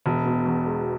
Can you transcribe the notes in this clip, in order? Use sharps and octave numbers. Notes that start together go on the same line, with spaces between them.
E1
B2
E2
G#3